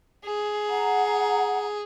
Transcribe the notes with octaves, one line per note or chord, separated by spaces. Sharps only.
G#4
F#5 A#5